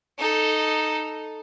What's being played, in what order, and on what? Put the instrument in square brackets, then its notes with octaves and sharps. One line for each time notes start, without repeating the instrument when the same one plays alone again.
[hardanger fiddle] D#4 A4